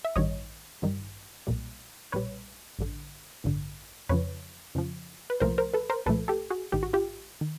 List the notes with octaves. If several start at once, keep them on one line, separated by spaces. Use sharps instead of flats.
E5
A1 G2 D#3 G3 C#5 D#5
A1 G2 D#3 G3
B1 A#2 G3
B1 A#2 G3 B4 C#5
A1 G2 D3
A1 G2 D3
F2 C#3 F3 B4 C#5
F2 C#3 F3
B4
C2 A#2 F3 A3 A#4 C5
A#4 C5
A4 B4
A#4 C5
C2 A#2 F3 A3 A4 B4
G4 A4
F#4 G#4
A1 G#2 D#3 G4
F#4
F4 G4
D#3